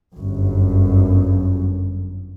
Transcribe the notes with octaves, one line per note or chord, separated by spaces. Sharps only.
G1 F#2